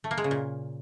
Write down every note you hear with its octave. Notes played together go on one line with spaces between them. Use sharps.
A3
A#3
G#3
C#3
A#2